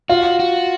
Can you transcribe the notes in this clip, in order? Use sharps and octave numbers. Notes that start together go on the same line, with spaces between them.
F4 F#4
F#4